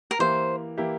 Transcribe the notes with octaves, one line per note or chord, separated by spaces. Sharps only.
A#4
E3 A#3 E4 G4 C5
E3 A#3 E4 G4